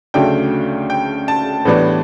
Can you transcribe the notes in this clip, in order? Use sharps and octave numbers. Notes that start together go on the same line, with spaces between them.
D2 C#3 F#3 A3 D4 G5
G5
A5
A2 E3 G3 B3 D4